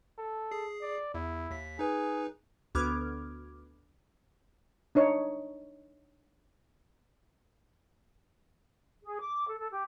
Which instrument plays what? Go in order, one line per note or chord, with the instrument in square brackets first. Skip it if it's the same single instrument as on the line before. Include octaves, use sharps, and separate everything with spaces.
[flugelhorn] A4
[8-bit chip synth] G#4 C7
[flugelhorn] D5
[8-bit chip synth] E2 [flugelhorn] E4
[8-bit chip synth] D#2 B6
[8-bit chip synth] D#4 B4 [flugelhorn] G#4
[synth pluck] D2 B3 D6 F6 G#6
[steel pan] D4 D#4 C#5
[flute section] G#4
D6
A4
A4
G4